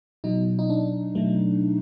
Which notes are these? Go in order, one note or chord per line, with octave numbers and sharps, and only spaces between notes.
B2 F#3 D#4
D#4
D4
B2 F#3 A3